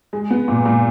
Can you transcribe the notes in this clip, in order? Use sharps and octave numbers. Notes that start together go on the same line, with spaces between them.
G#3
B3
A#2
A#2